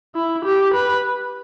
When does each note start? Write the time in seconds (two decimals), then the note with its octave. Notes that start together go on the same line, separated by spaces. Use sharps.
0.15 E4
0.45 G4
0.74 B4